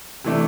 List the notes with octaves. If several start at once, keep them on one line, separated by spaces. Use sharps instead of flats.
C3 E3 A3 D4